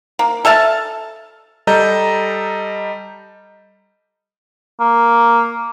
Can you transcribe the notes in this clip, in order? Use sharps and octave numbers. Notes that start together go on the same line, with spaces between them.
A#3
A4 E5 F5 A5
G3 A4 D#5 A#5 G6
A#3